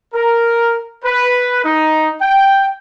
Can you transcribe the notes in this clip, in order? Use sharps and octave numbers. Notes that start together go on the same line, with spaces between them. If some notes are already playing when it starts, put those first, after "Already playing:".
A#4
B4
D#4
G5